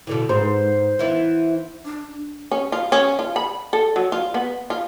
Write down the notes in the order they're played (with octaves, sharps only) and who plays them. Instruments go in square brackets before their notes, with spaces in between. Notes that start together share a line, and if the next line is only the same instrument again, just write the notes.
[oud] B2 D3 E3
[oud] G#2 [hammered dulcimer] C5
[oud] E3 B3 E4
[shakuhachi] D4
[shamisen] C#4
F4
C#4
F4
B5
A4
F#3
F4
B3
F4